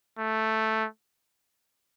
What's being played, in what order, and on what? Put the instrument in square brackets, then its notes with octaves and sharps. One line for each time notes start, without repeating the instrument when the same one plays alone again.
[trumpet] A3